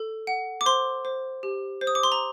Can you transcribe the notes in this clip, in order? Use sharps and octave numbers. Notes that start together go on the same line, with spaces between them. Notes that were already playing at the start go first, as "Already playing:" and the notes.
Already playing: A4
F#5
D6
C5 C6
C5
G4
C5
D#6
D6
C6
A#5